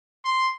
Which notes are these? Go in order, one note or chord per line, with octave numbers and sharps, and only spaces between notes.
C6